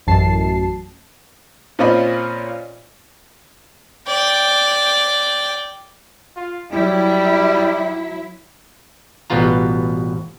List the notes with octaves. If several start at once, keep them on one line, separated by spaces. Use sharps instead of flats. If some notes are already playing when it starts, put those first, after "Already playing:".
A1 F#2 A5 C7
A#2 C4 C#4 F4 D#5 B5
D5 G5
F4
F#3 G3 E4
A1 B2 G3 B3 F4 A#5